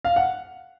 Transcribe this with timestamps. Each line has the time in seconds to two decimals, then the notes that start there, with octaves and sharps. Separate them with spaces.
0.05 F5
0.16 F#5